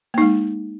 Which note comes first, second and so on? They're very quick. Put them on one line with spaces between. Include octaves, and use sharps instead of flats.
A#3 D#4 G#3